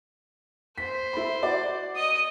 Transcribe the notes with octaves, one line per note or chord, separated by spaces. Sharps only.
C5 B6
E4 B5
F#4 D5
D#5 D#6